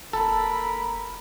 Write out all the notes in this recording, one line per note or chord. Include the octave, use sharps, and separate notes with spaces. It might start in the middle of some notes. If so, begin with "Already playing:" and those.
F#1 A4 A#4 B5